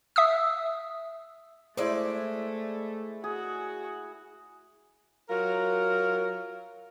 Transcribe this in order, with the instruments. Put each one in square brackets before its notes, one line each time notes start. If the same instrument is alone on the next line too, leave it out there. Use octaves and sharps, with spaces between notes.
[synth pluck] E5 D#6 E6
[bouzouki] G#3 D5 [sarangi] A3 [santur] E4 E6 [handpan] C5
[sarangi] F#4 [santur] G#4
[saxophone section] F#3 F4 A#4